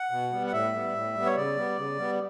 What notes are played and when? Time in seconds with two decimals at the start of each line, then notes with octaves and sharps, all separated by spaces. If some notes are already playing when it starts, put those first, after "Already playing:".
Already playing: F#5
0.11 B2
0.32 G3 B3
0.47 F#5
0.53 A2 E5
0.73 G3 B3
0.94 A2
1.15 G3 B3
1.26 C#5
1.36 C#3 D5
1.56 G3 B3
1.77 C#3
1.98 G3 B3